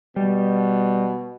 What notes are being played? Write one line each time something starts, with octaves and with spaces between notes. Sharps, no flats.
B2 G3